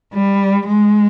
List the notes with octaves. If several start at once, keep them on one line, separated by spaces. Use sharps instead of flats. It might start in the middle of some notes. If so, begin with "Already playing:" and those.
G3
G#3